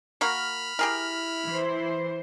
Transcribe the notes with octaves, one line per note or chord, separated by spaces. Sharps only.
A#3 F#4 A#4 B5 F6
E4 G4 G#4 A#4
E3 C5